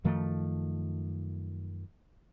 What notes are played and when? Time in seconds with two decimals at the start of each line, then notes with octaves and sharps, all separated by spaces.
0.04 F#2 D#3 F3 A3